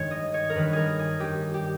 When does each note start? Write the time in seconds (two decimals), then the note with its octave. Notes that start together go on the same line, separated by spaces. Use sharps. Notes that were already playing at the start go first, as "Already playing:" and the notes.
Already playing: G2 D#3 G#3 C#5
0.11 D#5
0.34 C#5
0.50 A#4
0.55 G2 D#3 G3 B4
0.73 G#4 A#4
0.99 G#4
1.20 G2 G3 G4
1.54 G4